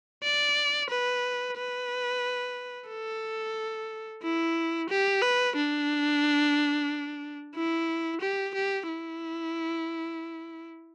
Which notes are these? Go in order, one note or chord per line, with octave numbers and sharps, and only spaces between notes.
D5
B4
B4
A4
E4
G4
B4
D4
E4
G4
G4
E4